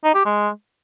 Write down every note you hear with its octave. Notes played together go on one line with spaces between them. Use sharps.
D#4
G4
G#3